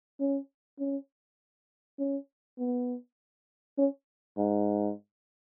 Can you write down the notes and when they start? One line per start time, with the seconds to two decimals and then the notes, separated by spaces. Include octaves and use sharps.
0.20 C#4
0.79 C#4
1.99 C#4
2.59 B3
3.78 C#4
4.37 G#2